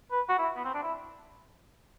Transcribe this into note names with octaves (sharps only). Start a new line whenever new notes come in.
B4
F#4
E4
B3
C4
D4
E4